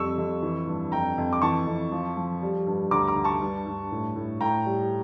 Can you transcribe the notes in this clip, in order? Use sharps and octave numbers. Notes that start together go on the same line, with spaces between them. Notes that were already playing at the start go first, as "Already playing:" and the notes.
Already playing: F2 G3 C#6 E6
F2
E3
G2
F2 G5 A#5
F2
D6
E3 A5 C#6
F2
F3
F3
G3
G2
D2 A#5 D6
A#5 D6
D2
A5 C#6
G2
G2
A2
A2
A2 G5 A#5
G3